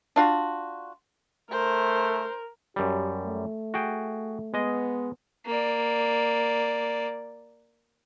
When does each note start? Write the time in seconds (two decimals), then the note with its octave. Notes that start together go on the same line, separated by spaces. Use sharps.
0.16 D4 F4 F#4
1.51 A3 A#4 C5
2.76 F#2 G3 G4
3.26 A3
3.74 F#4 G#4 G5
4.54 G#3 B3 D#5
5.46 A#3 D5